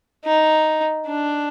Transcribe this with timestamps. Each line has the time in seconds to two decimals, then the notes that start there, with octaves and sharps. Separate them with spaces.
0.25 D#4
1.06 D4